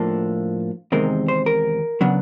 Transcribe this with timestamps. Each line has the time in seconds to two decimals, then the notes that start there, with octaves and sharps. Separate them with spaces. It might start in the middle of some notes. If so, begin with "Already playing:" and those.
Already playing: A2 F3 A#3 D4 A4
0.92 E2 C3 D#3 G#3 C4 A#4
1.28 C5
1.46 A#4
2.01 C#3 F#3 B3 D4